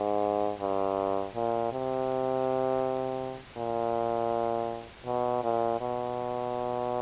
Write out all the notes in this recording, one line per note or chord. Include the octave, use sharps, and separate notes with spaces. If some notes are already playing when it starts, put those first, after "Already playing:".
Already playing: G#2
G2
A#2
C3
A#2
B2
A#2
B2